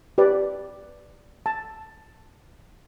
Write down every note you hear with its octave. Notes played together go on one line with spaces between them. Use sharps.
G4 B4 D5
A5